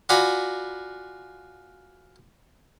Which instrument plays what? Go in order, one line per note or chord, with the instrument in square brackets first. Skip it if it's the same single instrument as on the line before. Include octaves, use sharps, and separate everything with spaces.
[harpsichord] F4 F#4 D5 G#5 A#5 B5